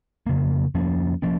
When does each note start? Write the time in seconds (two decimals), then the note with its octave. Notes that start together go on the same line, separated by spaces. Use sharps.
0.26 F2 C#3 A#3
0.75 F2 F3 A#3 C#4
1.22 F3 A#3 C#4